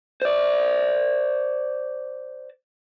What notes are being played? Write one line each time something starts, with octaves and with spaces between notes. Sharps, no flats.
C5 D5